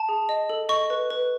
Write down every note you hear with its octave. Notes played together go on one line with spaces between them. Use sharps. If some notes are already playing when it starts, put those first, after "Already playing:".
Already playing: A5
G#4
D#5
A4
D#5 C#6
B4
B4